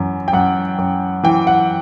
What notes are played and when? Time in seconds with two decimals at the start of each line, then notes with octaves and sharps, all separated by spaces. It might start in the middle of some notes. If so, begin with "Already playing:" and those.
Already playing: F#2 E3
0.28 G5
0.33 F#2 F#5
0.78 F#2
1.24 E3 G5
1.47 F#5